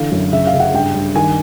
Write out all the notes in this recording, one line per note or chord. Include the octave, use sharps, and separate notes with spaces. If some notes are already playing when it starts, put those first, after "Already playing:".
Already playing: D3 E3 F5
F#2
C#3 E5
F5
C#3
F#5
G2 G5
G2
D#3 G#5